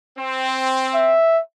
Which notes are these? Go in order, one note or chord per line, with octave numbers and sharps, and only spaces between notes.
C4
E5